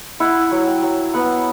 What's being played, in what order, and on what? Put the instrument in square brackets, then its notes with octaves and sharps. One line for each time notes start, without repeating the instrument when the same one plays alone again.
[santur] E4 F#5
F#3
G5
F#3
B3 F#5